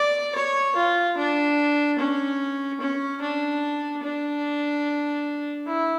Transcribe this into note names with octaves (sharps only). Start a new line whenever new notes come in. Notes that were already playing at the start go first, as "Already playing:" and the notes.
Already playing: D5
C#5
F4
D4
C#4
C#4
D4
D4
E4